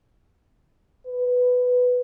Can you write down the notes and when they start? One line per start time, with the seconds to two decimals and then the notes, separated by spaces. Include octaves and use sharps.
1.07 B4